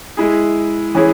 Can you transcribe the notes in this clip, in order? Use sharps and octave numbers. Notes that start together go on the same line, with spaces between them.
G#3 E4 G#4
E3 C#4 E4 G#4